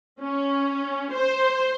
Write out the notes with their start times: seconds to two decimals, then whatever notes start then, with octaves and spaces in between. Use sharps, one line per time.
0.20 C#4
1.12 C5